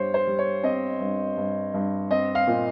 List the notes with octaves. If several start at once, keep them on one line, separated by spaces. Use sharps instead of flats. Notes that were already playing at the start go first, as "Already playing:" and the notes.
Already playing: G2 G3 C5 C#5
C5
G3
C#5
C4 D#5
G2
G2
G2
C4 D#5
F5
A#2